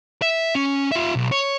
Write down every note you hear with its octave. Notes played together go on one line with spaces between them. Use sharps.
E5
C#4
F4 E5
B1
C#5